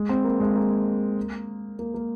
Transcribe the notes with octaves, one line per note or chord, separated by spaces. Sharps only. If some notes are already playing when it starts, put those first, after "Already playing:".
Already playing: G#3
C4
A#3
G#3
A#3
A#3
A#3